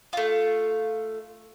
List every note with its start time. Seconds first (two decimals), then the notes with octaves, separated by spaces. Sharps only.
0.13 A3 F4